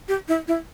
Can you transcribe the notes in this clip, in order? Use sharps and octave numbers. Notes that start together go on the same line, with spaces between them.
G4
E4
E4